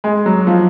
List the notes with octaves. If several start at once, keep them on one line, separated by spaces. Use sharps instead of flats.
G#3
F#3
F3